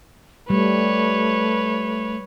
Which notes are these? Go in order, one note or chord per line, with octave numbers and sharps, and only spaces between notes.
G3 A3 B4 C#5